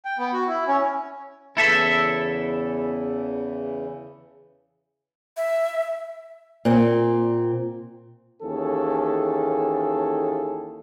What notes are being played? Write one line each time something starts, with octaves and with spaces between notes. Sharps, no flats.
G5
B3
F#4
E4
C#4
E2 C#3 E3 E4 A4 E5
E5
A#2 C4
D#2 E3 C#4 G#4 A4